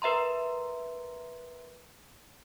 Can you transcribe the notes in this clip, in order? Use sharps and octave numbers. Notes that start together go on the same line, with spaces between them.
A#4 B4 E5 A#5 C6